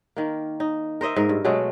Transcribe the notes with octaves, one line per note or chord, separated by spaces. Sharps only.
D#3 A#3
D#4
A#4 C5 D#5 E5
G#2 A#4
G2
B2 F#3 G#3 A3